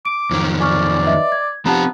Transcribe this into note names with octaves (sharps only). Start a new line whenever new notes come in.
D6 D7
F2 D#3 F#3
D5 G#5 C#6 F6
B4 D#5 E5
G#6
F3 B3 C4 G4 F#5 A5 A#5